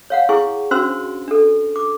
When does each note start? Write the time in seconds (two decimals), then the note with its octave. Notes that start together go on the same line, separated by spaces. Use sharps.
0.10 C#5 F5 F#5
0.29 E4 G#4 G#5 C#6
0.71 C#4 D4 F#4 C5 C6 E6
1.28 D4 A4
1.76 D6